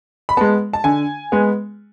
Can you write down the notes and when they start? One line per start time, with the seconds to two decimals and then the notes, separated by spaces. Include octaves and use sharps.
0.29 B5
0.37 G#3 B3 A5
0.73 A5
0.84 D3 G#5
1.32 G#3 B3